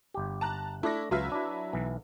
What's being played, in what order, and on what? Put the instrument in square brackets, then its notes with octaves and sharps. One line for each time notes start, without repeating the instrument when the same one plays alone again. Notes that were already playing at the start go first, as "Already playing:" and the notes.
[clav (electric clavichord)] G1 G4
[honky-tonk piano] A5 A#5 F#6
[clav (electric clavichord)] A3 D4 [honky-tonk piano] E4 A#6
[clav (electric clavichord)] C#2 F4 F5 [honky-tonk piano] F#3 B4 E5
[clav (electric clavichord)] D4 E4
B1 E3